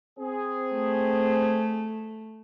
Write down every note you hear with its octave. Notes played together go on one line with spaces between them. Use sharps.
C4 G#4
A3